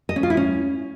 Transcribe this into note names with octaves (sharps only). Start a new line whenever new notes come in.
D#5
C#4
F4
E4
C#4